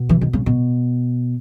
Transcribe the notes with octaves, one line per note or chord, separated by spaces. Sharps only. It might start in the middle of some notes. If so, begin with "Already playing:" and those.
Already playing: B2
E3
D#3
C#3
B2